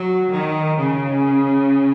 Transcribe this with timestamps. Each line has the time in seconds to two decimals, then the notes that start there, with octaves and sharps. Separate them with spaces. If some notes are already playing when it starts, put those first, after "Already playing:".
Already playing: F#3
0.36 D#3
0.77 C#3